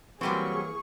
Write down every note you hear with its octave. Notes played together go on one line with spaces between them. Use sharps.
E3 F#3 G3 A#3 C4 G#4 C#6